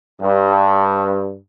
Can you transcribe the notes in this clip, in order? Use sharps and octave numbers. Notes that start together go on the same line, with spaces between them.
G2